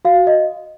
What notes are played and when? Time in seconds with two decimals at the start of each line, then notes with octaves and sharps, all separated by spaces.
0.05 F#4 F5
0.27 D#5